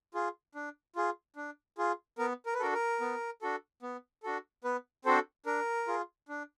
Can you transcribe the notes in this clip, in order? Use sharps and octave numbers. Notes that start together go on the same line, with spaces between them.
F4 G#4
D4
F4 G#4
D4
F4 G#4
B3 A#4
A#4
B4
D4 F#4 A4 A#4
A#4
B3
D4 F#4 A4
B3
D4 F#4 A4
B3 B4
C4 D4 F#4 A4 C5
D4 A#4
F4 G#4
D4